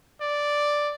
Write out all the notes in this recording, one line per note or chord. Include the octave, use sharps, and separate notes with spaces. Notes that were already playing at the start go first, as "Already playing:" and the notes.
D5